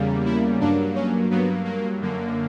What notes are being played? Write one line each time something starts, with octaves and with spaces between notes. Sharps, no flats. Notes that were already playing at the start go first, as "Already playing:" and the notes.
Already playing: E2 C#3 G3 A#3
E4
G2 F#3 A#3 D4
C#4
G2 F#3 A#3 B3
A#3
F#2 D3 A#3